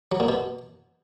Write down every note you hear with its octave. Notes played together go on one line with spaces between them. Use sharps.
F#3
A#2
B2